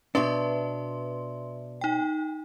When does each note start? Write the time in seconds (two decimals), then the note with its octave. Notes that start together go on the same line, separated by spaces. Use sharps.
0.15 B2 D4 B4 E5 C6
1.81 D#4 G5